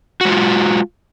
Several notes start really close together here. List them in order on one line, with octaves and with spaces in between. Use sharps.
F#4 G#3 F4